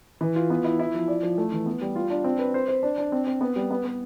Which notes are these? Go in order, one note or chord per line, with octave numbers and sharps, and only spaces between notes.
E3
F4
B3
E4
E4
F3
D5
F3
A3
E3
B3
G3
F4
D4
C4
B4
C5
C5
D4
D4
C4
C4
B3
G3
B3
B3